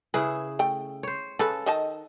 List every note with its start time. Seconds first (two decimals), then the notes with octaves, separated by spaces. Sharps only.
0.14 C#3 E4 G#4 B4
0.59 A3 G5
1.03 C5 C#5
1.39 C#3 A4 B4
1.66 D#3 D#5 A5